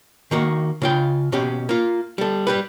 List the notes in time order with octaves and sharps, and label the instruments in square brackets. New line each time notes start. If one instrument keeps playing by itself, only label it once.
[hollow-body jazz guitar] D#3 A#3 F#4
C#3 F4 G5
B2 C#4 G4
A#3 F4
G3 A4
G3 G4 B4